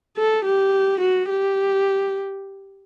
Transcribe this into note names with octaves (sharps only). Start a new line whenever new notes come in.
A4
G4
F#4
G4